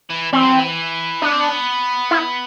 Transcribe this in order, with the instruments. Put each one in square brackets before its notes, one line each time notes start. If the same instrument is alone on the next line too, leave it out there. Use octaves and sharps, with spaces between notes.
[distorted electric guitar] E3
[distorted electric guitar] E3 [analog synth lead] C4
[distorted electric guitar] F#3
E3
[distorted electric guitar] B3 [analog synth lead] D4
[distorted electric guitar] C4
B3
[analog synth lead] E4